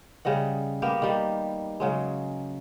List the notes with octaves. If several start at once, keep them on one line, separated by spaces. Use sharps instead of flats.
C#3 G3 D#5 F#5
A#3 B3 G4 A#4
D#3 G3
C#3 F#3 G#3